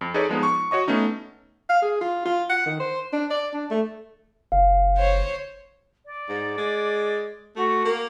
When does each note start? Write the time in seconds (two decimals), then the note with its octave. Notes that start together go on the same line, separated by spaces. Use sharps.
0.01 F2
0.14 D#4 G#4 A4 B4 C#5 D5
0.29 F3 G#3 B3 D#4
0.43 C#6
0.71 F#4 C#5 D#5 C#6
0.88 A3 B3 C#4 D#4
1.70 F5
1.82 G#4
2.01 F4
2.26 F4
2.50 F#5
2.66 D#3
2.80 C5
3.13 D4
3.31 D5
3.54 D4
3.71 A3
4.52 F#1 F5
4.97 C5 C#5
6.05 D5
6.29 G#2
6.58 G#3
7.56 A3 F#4
7.85 A#3